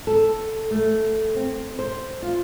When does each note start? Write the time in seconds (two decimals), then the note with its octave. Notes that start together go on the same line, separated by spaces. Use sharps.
0.07 A4
0.71 A3
1.35 C4
1.79 C5
2.22 F4